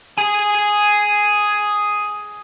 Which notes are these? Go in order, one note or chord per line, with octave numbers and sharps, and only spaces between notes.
G#4 G#5